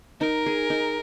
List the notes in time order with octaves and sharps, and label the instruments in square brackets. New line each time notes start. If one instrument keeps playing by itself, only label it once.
[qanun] D#4 [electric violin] A#4
[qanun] G#4
D#4